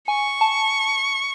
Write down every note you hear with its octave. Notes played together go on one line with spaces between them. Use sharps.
G#5 C#6
A5